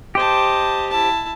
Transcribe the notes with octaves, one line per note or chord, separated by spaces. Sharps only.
G4 C5 D#5 A5
E4 A5